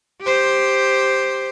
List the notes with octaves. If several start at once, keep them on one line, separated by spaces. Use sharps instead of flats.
G4 C5